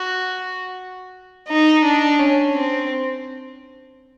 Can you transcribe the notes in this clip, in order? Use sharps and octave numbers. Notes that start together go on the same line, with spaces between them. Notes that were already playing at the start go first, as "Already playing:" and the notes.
Already playing: F#4
D#4
D4
C#4
C4